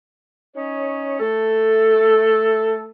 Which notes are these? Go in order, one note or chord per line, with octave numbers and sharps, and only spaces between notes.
C#4 D#4 C#5
A3 A4